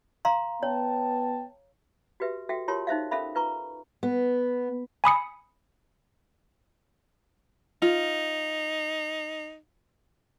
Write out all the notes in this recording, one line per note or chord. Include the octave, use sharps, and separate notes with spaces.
F5 A#5 C6
B3 C#5 G5 A5
F#4 G4 B4 E5
F#4 A4 E5 G5
F4 G4 A#4 C#5 A5 C6
D#4 C5 E5 F5
C#4 A4 A#4 E5 F5 B5
F4 B4 A#5 C#6
B3
G#5 B5 D#6 C#7
D#4 F4